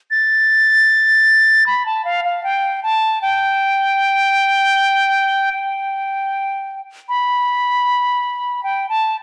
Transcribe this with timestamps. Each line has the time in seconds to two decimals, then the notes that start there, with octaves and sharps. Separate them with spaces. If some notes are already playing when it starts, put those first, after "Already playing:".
0.11 A6
1.66 B5
1.86 A5
2.05 F5
2.25 F5
2.43 G5
2.83 A5
3.22 G5
5.54 G5
7.09 B5
8.63 G5
8.89 A5